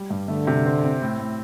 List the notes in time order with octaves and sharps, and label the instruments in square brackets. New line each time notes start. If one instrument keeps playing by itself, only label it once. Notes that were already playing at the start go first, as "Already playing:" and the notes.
Already playing: [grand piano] G3
G2
[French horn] D3 [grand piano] A3
[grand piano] C3
C4
C4
A2
A2